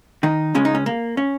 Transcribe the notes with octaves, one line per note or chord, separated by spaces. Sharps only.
D#3 D#4
C#2 C#3 G#3 C#4
D#4
C#4
A#3
C#4